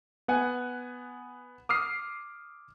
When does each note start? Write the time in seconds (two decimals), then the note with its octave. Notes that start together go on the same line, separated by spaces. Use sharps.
0.28 B3 F#5 G#5
1.69 D6 D#6 F6 C7